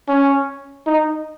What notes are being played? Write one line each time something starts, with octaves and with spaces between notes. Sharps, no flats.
C#4
D#4